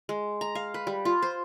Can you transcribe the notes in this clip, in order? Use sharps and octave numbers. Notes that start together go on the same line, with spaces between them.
G#3
A#5
F5
B4
G3
F4
C5